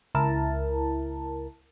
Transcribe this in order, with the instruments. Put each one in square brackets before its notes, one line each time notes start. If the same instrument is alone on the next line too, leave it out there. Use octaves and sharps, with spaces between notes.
[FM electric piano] C#2 E4 A#4 A5